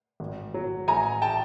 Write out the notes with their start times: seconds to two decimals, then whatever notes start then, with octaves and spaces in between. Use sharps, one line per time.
0.20 G#1
0.54 F#3
0.88 A1 G#5 A#5
1.22 G5 A5